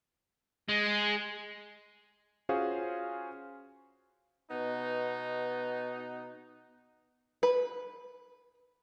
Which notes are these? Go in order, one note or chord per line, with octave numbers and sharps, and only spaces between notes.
G#3
C#4 F4 F#4 G#4 C5 F5
B2 B3 D#4
B4